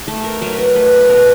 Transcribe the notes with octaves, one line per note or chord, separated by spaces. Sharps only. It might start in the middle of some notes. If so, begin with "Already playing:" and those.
A3 A4
A#4
F#3 A#4
B4
A#4
A3 B4
B4
B2 A#4